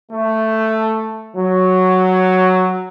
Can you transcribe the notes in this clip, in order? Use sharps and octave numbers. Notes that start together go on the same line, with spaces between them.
A3
F#3